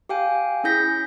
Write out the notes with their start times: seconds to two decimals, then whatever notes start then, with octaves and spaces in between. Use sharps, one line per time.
0.09 G4 F5 G5 G#5
0.64 C#4 E4 G#4 G6 A#6 B6